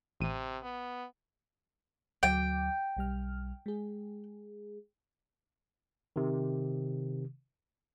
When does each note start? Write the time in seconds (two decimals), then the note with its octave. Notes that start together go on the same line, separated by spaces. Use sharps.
0.20 A1 C3 D#7
0.63 B3
2.23 D2 F#3 G5 D6
2.97 B1 G3 F6
3.66 G#3 G#4
6.16 C3 D#3